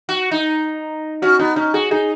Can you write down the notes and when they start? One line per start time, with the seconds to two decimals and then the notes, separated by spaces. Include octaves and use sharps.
0.09 F#4
0.31 D#4
1.22 C#4 F#4
1.39 B3 D#4
1.56 C#4 D#4
1.74 F#4 G#4
1.91 D#4 G#4